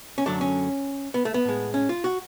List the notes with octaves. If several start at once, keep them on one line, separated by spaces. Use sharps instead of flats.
C#4
F#2 D3 F#3 A3 D4
C#4
B3
A3
B3
A2 G#3
C#4
F4
F#4